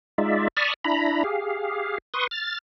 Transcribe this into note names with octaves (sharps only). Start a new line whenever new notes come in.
G#3 D#4 F4 D5 E5
D5 A5 B5 C#6 D#6 F6
D4 E4 A#5 B5
G4 G#4 F5
B4 C6 C#6 D#6
F6 A6